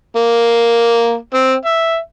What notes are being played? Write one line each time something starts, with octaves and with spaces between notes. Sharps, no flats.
A#3
C4
E5